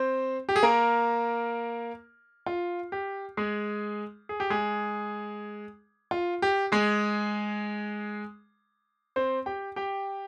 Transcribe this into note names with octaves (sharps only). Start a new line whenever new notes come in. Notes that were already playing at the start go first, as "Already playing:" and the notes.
Already playing: C4 C5
G4
G#4
A#3 A#4
F4
G4
G#3 G#4
G#4
G4
G#3 G#4
F4
G4
G#3 G#4
C4 C5
G4 G5
G4 G5